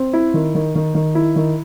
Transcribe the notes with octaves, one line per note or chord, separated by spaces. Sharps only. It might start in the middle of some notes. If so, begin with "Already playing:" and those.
Already playing: C4
E4
D#3
D#3
D#3
D#3
E4
D#3